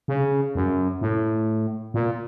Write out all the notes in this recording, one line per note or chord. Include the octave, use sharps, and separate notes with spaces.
C#3
F#2
A2
A#2